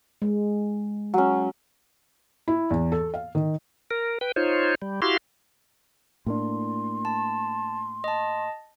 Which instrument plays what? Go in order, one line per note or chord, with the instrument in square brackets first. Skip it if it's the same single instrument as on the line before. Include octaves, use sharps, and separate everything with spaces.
[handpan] G#3
[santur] F#3 C#4
[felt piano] E4
E2
A4
F5
D#3
[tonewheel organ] A#4
B4 G5
D#4 F4 C5 C#5
G3
E4 F#4 G4 F5 C6
[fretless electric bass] A2 A#3 D4 [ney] C6
[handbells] A5
D#5 A5